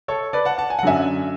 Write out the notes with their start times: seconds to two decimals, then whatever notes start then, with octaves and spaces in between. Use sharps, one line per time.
0.08 A4 C#5
0.33 B4 D5
0.45 F#5 A5
0.58 F#5 A5
0.70 G#5
0.79 F#5
0.83 F#2 D3 F#3 E5 G#5